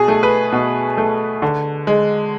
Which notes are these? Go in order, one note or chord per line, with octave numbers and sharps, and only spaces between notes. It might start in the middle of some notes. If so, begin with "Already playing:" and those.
Already playing: B2 G#4
A3
B4
B2
A3
D3
G#3